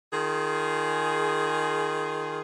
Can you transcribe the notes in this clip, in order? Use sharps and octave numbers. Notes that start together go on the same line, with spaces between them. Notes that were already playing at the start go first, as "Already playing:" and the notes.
D#3 F4 G#4